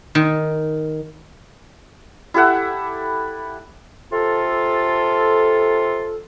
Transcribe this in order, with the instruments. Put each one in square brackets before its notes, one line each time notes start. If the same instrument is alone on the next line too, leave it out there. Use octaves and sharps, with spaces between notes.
[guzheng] D#3
[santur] E4 G4 A4 F#5
[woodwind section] C3 F4 A4